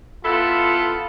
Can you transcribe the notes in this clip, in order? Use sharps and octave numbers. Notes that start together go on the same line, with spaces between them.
B3 E4 F4 A4